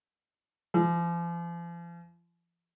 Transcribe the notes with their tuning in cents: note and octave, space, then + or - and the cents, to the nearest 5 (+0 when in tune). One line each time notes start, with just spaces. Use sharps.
F3 -40